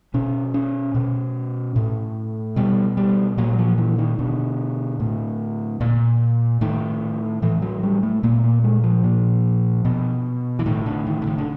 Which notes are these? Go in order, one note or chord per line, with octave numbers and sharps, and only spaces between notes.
B2 C#4
C#4
B2
A2
B2 G3
G3
A#2 F#3
F3
E3
D#3
B2 D3
A2
A#2
A2 D#3
A2 E3
F#3
G3
A3
A#2 A#3
A#3
G#3
F3
A#2
B2
E3
A2 D#3
D3
D#3
D3
D#3
D3